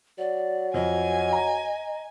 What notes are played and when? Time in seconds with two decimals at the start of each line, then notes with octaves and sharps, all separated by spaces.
0.18 F#3 D5
0.74 F2 D#5 G#5
1.33 A#5